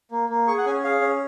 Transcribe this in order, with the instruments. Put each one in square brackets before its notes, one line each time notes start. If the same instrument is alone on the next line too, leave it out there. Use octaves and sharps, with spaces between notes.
[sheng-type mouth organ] A#3
A#3
G#4 C#6
F#5
C#4 G#5
G#4 F5
C#4